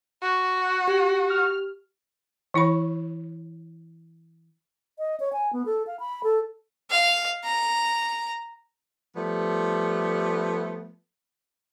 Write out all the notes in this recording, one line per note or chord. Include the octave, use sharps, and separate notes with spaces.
F#4
G4
F6
E3 E4 C#5 B5
D#5
C#5
G#5
B3
A4
F5
B5
A4
F5
A#5
F3 G3 A3 B3